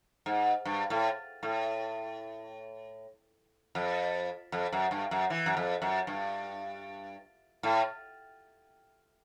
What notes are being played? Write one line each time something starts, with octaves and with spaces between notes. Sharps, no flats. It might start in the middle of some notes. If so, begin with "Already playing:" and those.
G#2
G2
A2
A2
F2
F2
F#2
G2
F#2
E3
F#2
F2
F#2
G2
A2